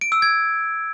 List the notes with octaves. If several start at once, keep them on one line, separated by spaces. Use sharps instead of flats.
D7
E6
G#6